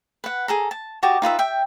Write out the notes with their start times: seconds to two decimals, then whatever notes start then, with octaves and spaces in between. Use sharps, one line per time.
0.24 B4 F#5
0.48 G#4 A4 A#5
0.71 A5
1.03 F#4 G4 D#5 A5
1.22 D#4 F4 B4 E5
1.39 E5 G5